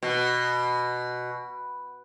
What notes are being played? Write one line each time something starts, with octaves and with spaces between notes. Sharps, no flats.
B2